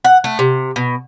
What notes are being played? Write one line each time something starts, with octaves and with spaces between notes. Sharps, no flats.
F#5
A3
C3
B2